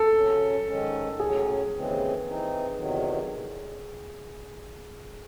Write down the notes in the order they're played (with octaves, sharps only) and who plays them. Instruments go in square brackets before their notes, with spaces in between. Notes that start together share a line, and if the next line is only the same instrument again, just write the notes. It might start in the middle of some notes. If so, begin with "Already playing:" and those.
Already playing: [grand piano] A4
[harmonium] C#3 F#3 C#4
G#2 D#3 G#3 C#4
[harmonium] A2 F#3 C#4 [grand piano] G#4
[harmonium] D#2 C#3 E3 G#3 C4
E3 C4 D#4
E2 C3 D#3 F#3